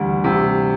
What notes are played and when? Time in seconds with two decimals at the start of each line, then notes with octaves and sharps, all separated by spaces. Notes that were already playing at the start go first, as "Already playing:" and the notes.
Already playing: D2 E3 G3
0.24 C3